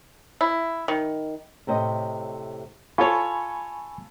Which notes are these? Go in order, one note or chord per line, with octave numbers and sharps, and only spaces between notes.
E4
D#3
A2 C3 C5 C#5 D#5
F4 A4 C#5 G#5 B5 C#6